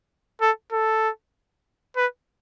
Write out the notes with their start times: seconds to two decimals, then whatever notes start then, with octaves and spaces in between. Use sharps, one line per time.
0.41 A4
0.72 A4
1.97 B4